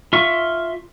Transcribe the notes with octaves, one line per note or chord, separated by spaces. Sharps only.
F4 E5 C#6